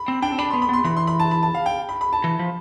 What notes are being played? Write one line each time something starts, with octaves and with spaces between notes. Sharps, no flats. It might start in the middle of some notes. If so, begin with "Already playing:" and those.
Already playing: B5
C4
D4 G5
C4
D4 B5
B3 C6
B5
B3 C6
E3 B5
C6
B5
A5
B5
A5
F5
G5
B5
B5
A5
E3
F3